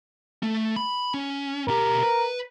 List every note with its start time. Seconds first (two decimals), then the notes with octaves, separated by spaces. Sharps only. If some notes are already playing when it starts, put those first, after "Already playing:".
0.43 A3
0.76 B5
1.14 C#4
1.68 B2 G4 A#4
2.03 B4